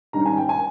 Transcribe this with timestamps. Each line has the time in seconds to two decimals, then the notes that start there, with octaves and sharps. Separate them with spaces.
0.13 G#2 D#3 G3 C#4 A#5
0.26 G#5
0.37 G5
0.49 G#5